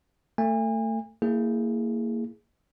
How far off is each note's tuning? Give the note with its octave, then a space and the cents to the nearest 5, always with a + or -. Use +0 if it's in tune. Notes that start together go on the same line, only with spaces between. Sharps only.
A3 +30 G#5 -40
A#3 -25 E4 +0 G#4 +0